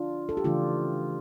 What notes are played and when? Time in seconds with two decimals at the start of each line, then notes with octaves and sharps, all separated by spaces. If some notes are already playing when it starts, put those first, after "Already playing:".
Already playing: D4 F4
0.29 A4
0.37 G4
0.44 C#3 E3 A3 D4 F4